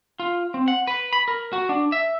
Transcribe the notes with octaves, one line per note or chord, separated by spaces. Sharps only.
F4
C4
F#5
B4
B5
A#4
F#4
D4
E5